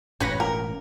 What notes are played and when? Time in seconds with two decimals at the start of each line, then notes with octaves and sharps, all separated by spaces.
0.20 E1 A2 C#4 B4 C#5 A#6
0.40 A#4